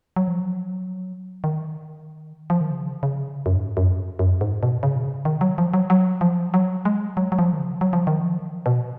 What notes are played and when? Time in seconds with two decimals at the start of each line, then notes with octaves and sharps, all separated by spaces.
0.16 F#3
0.28 F3
0.41 F#3
1.44 D#3
2.50 F3
2.61 D#3
2.71 C#3
3.03 C#3
3.46 F#2
3.56 G#2
3.77 F#2
4.19 F#2
4.41 G#2
4.63 B2
4.83 C#3
4.96 B2
5.05 C#3
5.25 D#3
5.41 F#3
5.58 F3
5.74 F#3
5.90 F#3
6.21 F3
6.54 F#3
6.85 G#3
7.17 F#3
7.32 F#3
7.39 F3
7.53 D#3
7.59 C#3
7.81 F#3
7.93 F3
8.07 D#3
8.20 F3
8.66 B2